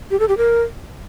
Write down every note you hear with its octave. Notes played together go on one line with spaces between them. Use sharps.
G4
A4
G4
A#4